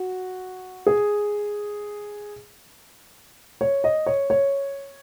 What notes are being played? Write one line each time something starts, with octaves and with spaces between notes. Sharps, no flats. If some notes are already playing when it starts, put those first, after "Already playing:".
Already playing: F#4
G#4
C#5
D#5
C#5
C#5